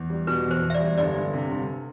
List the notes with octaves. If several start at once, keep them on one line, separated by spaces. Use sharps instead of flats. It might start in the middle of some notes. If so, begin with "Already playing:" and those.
Already playing: E2
G3
B2 B4
E2 C5
E2
E5
D5
G3
G1 D5
G1
C3
G1